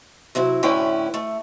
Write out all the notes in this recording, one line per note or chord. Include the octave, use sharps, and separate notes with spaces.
C3 F#3 E4
A2 D3 C#4 E4 B4 G5
A3